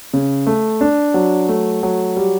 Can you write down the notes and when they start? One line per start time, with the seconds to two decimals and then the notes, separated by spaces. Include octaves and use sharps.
0.14 C#3
0.47 A3
0.81 D4
1.14 F#3
1.49 A3
1.83 F#3
2.17 G3